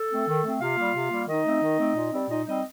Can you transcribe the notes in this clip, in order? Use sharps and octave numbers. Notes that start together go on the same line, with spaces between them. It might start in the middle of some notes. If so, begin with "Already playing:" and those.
Already playing: A4
A3 C4
D#3
A3 C4
C3 F4 F5
G3 A#3
C3
G3 A#3
D#3 D#4 D#5
A3 C4
D#3
A3 C4
A#2
G3 C4
A#2 D#4 D#5
G3 C4 D#4 D#5